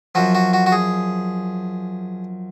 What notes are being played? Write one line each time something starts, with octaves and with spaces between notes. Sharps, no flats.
F#2 F3 F#4
F#4
F#4
F#4
G#4